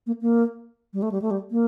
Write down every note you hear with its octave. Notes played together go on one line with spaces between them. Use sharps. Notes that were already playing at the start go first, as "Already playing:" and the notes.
A#3
A#3
G3
A3
G3
A3
G3
A#3